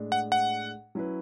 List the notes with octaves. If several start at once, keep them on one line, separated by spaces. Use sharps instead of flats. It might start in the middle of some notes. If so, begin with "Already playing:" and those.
Already playing: A2 G#3 D4
F#5
F#5
F#3 C#4 E4 B4